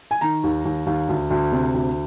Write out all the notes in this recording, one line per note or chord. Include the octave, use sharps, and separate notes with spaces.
G#5
D#3 A#5
D#2
D#2
D#2
D2
D2
C3
D2